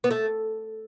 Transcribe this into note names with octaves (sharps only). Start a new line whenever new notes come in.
B3
A3